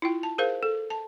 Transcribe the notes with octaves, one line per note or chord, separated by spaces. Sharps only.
E4 F4 G5
A5
G#4 A#4 C5 F5
A4
A5